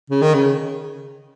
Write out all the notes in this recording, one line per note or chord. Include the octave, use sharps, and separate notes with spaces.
C#3
D#3
C#3